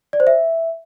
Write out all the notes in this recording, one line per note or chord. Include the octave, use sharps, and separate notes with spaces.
D5
C5
E5